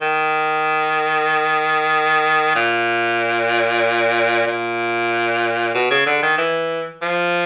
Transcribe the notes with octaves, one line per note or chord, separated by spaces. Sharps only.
D#3
A#2
A#2
B2
C#3
D3
D#3
E3
F3